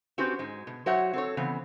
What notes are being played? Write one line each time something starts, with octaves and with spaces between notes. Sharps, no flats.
C4 C#4 F#4 G4 B4 C5
G#2 G#3
B2
F#3 F#4 C5 C#5 E5 F#5
C4 A4 C#5
C#3 E3 B3 C4